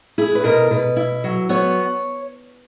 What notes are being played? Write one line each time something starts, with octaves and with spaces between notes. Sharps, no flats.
E4 G#4
B4
B2 A#4
B2 B4
E4
F#3
B3 C#5